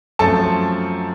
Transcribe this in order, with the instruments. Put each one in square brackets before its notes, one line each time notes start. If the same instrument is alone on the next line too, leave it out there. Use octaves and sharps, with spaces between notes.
[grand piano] F#2 F3 A3 C4 A4 A5